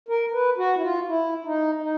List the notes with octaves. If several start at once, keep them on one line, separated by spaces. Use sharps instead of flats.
A#4
B4
F#4
E4
F4
E4
D#4
D#4